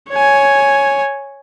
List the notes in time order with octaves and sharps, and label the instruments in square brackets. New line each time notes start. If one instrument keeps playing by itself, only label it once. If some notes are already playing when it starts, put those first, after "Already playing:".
[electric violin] C#5 G#5